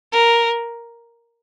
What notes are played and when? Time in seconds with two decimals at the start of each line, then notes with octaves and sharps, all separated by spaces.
0.12 A#4